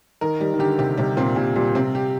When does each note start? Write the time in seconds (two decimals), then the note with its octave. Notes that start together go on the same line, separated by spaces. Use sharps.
0.21 D#3 A#4
0.40 D#3 G3
0.54 D#3
0.59 D3 G4
0.78 C3 G4
0.97 C3 G3
1.17 A#2 C4
1.36 A#2 G3
1.55 A#2 G3
1.75 C3 C4
1.95 G4